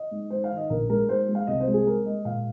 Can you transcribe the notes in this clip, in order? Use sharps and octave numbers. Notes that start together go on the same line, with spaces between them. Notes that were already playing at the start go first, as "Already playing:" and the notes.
Already playing: D#5
G#2
G#2 C5
F5
D#3
D#5
A#1 A#4
G#3 A#4
G#2 C5
G#3
F5
C2 D#5
C5
G#3
G#4
G#3 A#4
G#3 D#5
A#2 F5